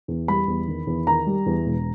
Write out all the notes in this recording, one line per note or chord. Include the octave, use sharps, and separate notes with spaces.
E2
G3 B5
E2
D#3
E2
D#3 A#5
G3
E2
E1